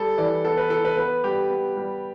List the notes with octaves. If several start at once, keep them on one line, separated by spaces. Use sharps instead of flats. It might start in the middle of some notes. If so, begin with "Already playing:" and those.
Already playing: G3 A4
E3 D5
B3 A4
B4
E3 A4
B4
B3 B4
G3 G4
B3
G3